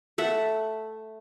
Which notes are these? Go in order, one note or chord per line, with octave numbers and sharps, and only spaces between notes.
A3 E5 F#5